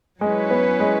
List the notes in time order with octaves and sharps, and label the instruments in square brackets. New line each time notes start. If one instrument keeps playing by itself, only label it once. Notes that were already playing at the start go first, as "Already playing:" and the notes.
[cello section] F#3 C#4 E4 B4 [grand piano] G#3
[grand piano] B3
G#3